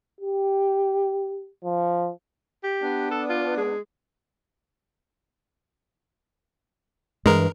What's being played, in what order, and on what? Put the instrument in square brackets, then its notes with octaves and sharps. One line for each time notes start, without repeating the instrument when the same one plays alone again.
[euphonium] G4
F3
[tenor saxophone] G4
[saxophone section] B3 D4
[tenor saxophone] A4
F4
G#3
[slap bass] G2 E3 [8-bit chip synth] G#3 A#4